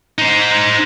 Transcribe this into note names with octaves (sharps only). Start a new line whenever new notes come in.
D#4 C5